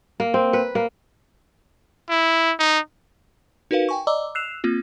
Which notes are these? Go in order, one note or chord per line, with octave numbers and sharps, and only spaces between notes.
A#3
C4
B4
A#3
E4
D#4
D#4 F#4 A#4 B4 F5
G5 G#5 C#6
D5 D#5 A#5 D6 E6
E6 F#6 C7 E7 F7
A#3 C4 F4